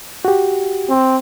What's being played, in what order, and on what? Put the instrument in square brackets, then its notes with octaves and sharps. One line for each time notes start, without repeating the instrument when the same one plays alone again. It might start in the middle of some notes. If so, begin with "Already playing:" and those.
[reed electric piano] F#4 G4
[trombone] C4